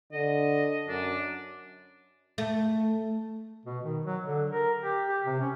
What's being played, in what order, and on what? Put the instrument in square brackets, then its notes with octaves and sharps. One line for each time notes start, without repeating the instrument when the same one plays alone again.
[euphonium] D3 [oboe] D#5
[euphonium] F#2 [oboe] D4
[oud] A3
[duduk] B2
D#3
F#3
D3
A#4
G4
G4
C3
C#4